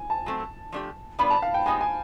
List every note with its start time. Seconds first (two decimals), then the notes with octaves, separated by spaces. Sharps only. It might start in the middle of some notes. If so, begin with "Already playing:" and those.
Already playing: G#5
0.10 A5
0.26 F#3 A3 C4
0.72 F3 A3 D4 G4
1.19 G3 B3 D4 F4 B5
1.30 A5
1.42 F5
1.54 G5
1.66 G#3 B3 D#4 G4 G#5
1.81 G#5